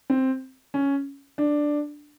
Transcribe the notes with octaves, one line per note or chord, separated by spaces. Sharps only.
C4
C#4
D4